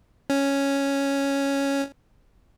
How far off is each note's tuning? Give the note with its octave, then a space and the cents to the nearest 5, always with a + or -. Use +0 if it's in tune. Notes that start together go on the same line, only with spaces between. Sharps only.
C#4 +0